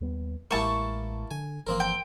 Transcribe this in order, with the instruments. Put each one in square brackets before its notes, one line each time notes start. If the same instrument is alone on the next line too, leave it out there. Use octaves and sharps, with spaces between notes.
[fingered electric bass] D#2 G3 B3
[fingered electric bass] A1 G#3 [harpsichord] A#3 E4 G4 [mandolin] A5 C#6
[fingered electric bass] D3 [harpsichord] G#5
[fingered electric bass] G1 E3 F3 [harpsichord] A#3 C4 A#4
[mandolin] G5